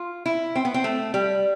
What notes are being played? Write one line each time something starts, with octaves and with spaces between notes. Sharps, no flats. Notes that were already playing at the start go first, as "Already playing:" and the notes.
Already playing: F4
E4
C4
B3
C4
A3
G3